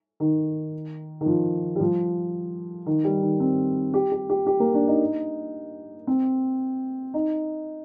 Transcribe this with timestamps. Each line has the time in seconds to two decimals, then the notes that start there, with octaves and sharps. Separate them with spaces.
0.20 D#3
1.21 D#3
1.26 F3
1.76 G3
1.80 F3
2.86 D#3
3.04 G3
3.22 D#3
3.40 C4
3.94 G4
4.12 G4
4.30 G4
4.47 G4
4.60 A#3
4.74 D4
4.88 D#4
6.07 C4
7.14 D#4